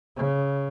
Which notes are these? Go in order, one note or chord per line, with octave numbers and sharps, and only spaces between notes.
C#3